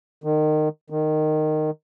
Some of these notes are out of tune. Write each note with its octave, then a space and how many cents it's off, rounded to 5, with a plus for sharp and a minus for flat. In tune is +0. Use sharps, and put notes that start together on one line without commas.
D#3 -25
D#3 -15